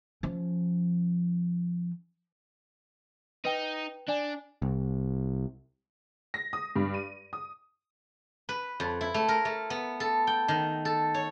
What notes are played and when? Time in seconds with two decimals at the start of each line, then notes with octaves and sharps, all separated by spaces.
0.23 F3 C#4
3.45 D#4 B4 G5
4.09 D4 D5 G#5
4.62 C2
6.34 A#6
6.53 D#6
6.76 G2
6.94 D#7
7.33 D#6
8.49 B4
8.80 F2
9.01 E4
9.14 A3
9.28 A#4
9.45 A3
9.70 B3
10.00 A4
10.27 G5
10.48 D#3
10.85 A4
11.14 C#5